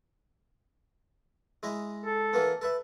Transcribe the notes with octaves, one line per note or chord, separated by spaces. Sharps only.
G#3 E4 D#5
A4
E3 A#3 B3
A4 B4 E5